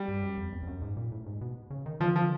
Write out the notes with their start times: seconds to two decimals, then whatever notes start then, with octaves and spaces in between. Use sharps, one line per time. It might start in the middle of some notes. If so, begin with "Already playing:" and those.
Already playing: G3
0.08 G2
0.23 F#2
0.38 F2
0.52 E2
0.63 F2
0.67 F#2
0.82 G#2
0.97 A#2
1.12 A2
1.26 G#2
1.41 B2
1.70 C#3
1.86 D#3
2.00 D3 F3
2.16 F3